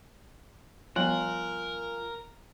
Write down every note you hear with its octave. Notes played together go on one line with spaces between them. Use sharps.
F3 G3 B3 F4 A#4 G#5 F#6 F#7